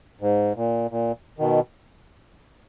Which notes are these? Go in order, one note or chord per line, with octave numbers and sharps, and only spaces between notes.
G#2
A#2
A#2
B2 D#3